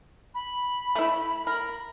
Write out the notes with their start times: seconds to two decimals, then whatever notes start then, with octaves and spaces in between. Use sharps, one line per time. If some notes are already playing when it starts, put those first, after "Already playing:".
0.34 B5
0.95 A3 E4
1.47 A#4